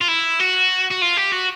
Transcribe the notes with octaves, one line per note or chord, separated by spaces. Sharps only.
F4
E4
F#4
F#4
F4
G4
F#4